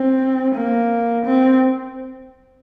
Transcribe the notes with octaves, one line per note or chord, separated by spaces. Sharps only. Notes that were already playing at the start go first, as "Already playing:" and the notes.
Already playing: C4
A#3
C4